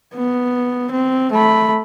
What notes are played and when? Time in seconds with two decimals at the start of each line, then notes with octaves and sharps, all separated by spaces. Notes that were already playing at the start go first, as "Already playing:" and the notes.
0.15 B3
0.92 C4
1.32 A3 B5